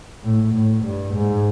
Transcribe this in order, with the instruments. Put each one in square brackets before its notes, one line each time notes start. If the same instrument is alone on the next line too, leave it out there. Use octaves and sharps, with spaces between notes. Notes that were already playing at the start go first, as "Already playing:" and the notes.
[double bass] A2
A2
G2
G#2